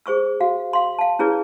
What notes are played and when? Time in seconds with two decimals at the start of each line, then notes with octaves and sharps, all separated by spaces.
0.06 G#4 C5 C#6 E6
0.41 F#4 F5
0.73 F5 C6
0.99 F5 A5
1.19 C#4 E4 G#4 B4 C#5